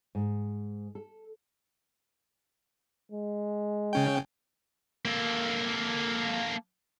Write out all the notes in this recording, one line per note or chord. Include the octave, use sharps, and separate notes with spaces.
G#2
A4
G#3
C#3 C#4 G5
A#3 A4